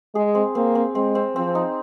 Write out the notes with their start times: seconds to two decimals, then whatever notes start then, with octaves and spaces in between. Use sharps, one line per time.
0.15 G#3 G#4
0.35 C4
0.55 A#3 C4
0.75 C4
0.95 G#3 C4
1.15 C4
1.35 F3 C4
1.55 D#4